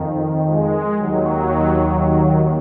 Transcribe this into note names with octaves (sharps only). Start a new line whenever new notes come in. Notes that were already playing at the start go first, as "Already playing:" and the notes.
Already playing: F2 D#3
G#3
D#2 D#3 F#3